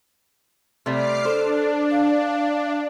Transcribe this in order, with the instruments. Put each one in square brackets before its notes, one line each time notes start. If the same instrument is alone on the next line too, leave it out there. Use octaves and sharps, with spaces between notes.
[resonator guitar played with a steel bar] C3 G3 A3 [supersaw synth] D6 F6 C7
[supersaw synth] D4 [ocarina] A4 [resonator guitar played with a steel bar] C5
[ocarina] F5